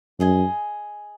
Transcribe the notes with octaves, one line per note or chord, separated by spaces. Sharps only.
F#2 G#4 D#5 G#5